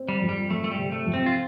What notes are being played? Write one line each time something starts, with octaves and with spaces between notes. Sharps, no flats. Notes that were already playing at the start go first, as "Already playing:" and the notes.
Already playing: C4
G3
F2
G3
F2 A3
A3
G3
C3
A3
F2
C4
F4